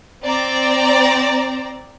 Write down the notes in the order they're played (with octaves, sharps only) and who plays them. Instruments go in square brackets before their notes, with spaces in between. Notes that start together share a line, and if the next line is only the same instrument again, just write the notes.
[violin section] C4 D5 A#5